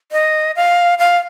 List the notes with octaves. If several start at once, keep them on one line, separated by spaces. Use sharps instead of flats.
D#5
F5
F5